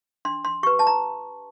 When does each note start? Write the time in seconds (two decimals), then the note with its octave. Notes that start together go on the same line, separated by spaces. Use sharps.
0.25 D4 C6
0.45 C6
0.63 G4 B4 C#6
0.79 A5
0.87 A#5